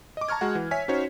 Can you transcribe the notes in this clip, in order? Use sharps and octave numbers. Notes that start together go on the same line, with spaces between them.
D#5 D6
A5 A#5 C#6 F6 G#6
G#3 F#4 F#5
E3
C#5 E5 G#5 B6
C#4 D#4 F#4 C5 C#5